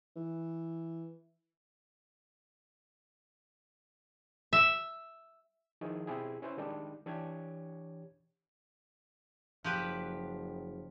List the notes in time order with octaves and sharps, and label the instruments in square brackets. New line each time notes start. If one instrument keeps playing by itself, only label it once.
[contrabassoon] E3
[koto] E5
[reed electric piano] D#3 F3 D#4 E4 G#4
B2 C4 E4 G4 G#4
C#4 E4 B4 C5
D#3 G3 G#3 D4 D#4
E3 D4 G4 C#5 G#6
[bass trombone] F#1 [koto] F3 G4 B4